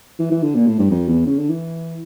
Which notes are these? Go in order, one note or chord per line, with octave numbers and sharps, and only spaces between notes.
E3
E3
D3
A#2
A2
G2
F2
E2
C#3
D3
E3